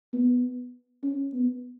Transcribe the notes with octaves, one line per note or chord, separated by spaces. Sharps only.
B3
C#4
B3